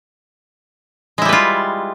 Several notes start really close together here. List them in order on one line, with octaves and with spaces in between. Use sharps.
G#3 E4 G3 B4 F4